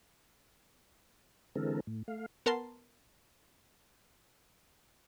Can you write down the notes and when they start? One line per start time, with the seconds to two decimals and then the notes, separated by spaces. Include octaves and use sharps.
1.55 D3 E3 G#3 C4 A4 A#4
1.87 A2
2.08 A3 F5
2.46 B3 A#4 A5 C6